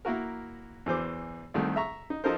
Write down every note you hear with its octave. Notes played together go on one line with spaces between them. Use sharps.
A#3 E4 F#4 A#4
E2 E3 C5 D6
C2 D#3 A3 C4
E5 A#5 C#6
D#4
F3 D#4 A4 A#4 C5